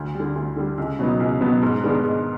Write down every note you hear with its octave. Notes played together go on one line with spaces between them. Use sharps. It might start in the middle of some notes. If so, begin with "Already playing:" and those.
Already playing: D2
G3
D3
D2
D3 G3
C#2
B2 F#3 B3 D#4
C#2
B2 F#3 B3 D#4
G#2
D#3 G#3 B3 D4
G#2